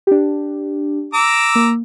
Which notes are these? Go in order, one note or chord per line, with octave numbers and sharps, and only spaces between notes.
D4 G4
A#5 D6 E6
A#3